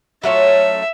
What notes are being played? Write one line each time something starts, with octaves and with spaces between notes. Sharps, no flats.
F#3 A3 C#4 F4 E5